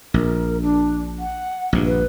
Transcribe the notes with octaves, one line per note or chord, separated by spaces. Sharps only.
A#1 A#4
D4
F#5
A#1 G2
B4